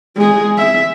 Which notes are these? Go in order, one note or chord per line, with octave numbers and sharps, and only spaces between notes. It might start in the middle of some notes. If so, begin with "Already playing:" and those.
G#3 G#4
E5